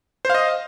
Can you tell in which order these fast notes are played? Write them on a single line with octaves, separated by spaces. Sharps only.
C5 F5 D#5